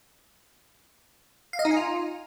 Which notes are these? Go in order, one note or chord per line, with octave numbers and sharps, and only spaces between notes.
F5
D#5
D#4
G#5
F4